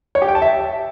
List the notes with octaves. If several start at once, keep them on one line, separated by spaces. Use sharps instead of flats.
C#5
G4
G5
A5
E5